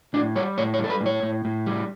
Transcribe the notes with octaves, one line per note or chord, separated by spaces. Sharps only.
A2 D4
G3 C#5
A2 C#5
C#5
G3 A4
B4
A2
C#5
A2
A2
G3